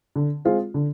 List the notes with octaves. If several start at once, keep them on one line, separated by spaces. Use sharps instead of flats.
D3
G#3 C4 F4 G#4
D3